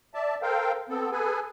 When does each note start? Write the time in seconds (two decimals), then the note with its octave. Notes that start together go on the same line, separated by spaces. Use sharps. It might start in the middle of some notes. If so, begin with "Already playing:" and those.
0.14 D5 E5 A5
0.42 A4 A#4 C5 F5 G5
0.89 B3 C4 A4
1.12 G#4 A4 B4 G#5